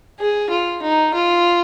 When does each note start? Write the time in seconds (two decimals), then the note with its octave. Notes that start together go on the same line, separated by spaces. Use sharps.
0.19 G#4
0.50 F4
0.83 D#4
1.14 F4